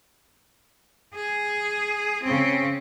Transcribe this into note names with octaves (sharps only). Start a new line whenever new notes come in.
G#4
C#3 C4